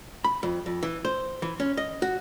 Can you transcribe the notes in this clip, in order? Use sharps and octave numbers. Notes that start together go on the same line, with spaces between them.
B5
F2
F2
E3
C5
E3
C#4
D#5
F#4